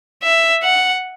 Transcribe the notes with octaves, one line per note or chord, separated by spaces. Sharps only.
E5
F#5